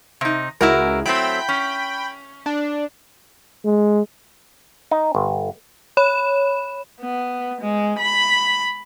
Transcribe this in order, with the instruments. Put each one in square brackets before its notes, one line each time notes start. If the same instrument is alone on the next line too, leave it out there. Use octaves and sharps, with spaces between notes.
[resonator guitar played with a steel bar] C3 D#4
[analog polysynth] C#2 G#3 [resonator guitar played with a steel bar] E4 F#4 A#4
[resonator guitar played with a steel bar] F#3 A3 C4 [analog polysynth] G5 B5
[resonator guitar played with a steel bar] C#4
[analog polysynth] D4
[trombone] G#3
[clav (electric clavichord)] D#4
G1
[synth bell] C#5 B5 E7
[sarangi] B3
G#3
B5